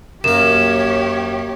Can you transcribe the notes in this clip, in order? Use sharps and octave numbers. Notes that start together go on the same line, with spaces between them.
F#2 A#3 G4 C#5 E7